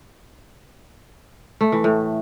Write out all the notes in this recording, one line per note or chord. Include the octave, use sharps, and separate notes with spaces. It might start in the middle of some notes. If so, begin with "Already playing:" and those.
A3
E3
A2